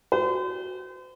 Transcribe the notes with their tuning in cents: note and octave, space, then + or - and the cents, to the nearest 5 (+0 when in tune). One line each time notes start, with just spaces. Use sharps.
F#4 +0 C5 -40